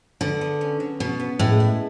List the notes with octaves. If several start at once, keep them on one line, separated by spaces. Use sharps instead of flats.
D3 B3
B3
C#4
F#3
B2 B3
B3
A2 G#3
E4